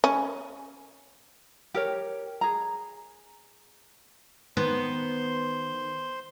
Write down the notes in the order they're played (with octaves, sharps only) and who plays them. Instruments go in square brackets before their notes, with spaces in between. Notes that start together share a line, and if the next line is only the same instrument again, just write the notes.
[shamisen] C#4
[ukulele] G4 A#4 C#5
G#4 A#5
[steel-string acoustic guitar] D#3 [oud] B3 [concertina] C5 C6